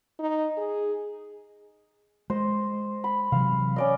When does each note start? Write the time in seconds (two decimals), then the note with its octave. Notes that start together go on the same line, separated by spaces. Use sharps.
0.19 D#4
0.57 G#4
2.30 G#3 C5 D#5
3.04 B5
3.32 C3 E3 F#3 F5
3.76 C#4 D5 D#5